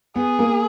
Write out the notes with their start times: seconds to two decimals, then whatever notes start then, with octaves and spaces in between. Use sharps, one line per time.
0.16 B3 G#4
0.39 A#3